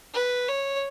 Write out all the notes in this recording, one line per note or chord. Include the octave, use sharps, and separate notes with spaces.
B4
C#5